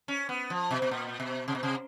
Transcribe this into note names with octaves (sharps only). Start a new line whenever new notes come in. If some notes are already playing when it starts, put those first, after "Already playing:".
C#4
B3
F3
B2
B2
A#2
B2
C3
B2
C3